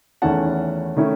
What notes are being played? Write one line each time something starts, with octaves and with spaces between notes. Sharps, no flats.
E2 D#3 A3 C#4 E4 F#5 A5
D#3 A3 C#4 E4